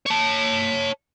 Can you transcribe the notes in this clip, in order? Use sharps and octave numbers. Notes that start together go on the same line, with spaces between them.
C#5 A5